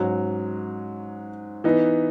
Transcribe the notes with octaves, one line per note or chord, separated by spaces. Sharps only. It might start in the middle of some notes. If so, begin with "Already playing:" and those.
Already playing: G#2 F#3 C#4 F#4
E3 B3 D#4